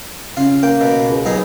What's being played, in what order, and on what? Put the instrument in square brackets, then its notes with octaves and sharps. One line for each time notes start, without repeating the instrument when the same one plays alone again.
[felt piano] C#3 [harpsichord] F4
[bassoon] A#3 [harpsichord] G5
[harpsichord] B2
[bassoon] C#2
[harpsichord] B1 D#4 G#4 [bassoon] B3